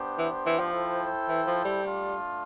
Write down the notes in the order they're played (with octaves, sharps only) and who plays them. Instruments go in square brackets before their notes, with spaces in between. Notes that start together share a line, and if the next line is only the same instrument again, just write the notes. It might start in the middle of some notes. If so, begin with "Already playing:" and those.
Already playing: [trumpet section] B3 D4 G4 C5
[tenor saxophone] E3
E3
F3
[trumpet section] E4 A4 C5 G5
[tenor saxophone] E3
F3
G3
[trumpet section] A3 D4 F4